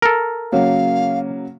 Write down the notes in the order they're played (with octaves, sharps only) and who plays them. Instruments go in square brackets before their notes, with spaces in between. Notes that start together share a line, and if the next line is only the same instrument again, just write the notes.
[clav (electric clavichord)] A4 A#4
[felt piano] C#3 F#3 A#3 [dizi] F5